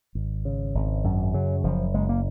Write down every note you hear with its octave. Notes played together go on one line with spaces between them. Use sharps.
G#1
C#3
G#1
F#2
C#3 F#3
F#1 F3
F#1 G#3
A#3